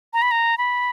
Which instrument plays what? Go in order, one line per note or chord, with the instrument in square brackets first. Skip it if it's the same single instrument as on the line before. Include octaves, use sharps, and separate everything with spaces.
[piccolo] A#5
B5
A#5
B5